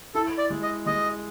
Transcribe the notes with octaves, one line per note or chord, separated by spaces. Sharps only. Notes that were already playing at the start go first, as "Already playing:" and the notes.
E4 A4
D5
G#3
D#5
G#3 D#5